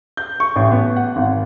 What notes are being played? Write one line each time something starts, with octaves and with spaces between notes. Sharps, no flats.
G6
C#6
A1
B3
F#5
G#1